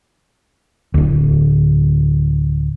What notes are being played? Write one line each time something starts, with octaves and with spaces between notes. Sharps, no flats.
D1 D2